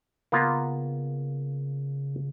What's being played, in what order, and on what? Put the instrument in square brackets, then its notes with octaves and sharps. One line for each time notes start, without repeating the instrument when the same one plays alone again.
[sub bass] C#3 [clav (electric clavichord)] A#3 B3 F4